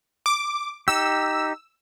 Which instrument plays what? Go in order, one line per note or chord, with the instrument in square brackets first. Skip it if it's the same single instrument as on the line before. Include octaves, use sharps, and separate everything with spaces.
[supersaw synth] D6
[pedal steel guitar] D#4 G4 [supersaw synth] E6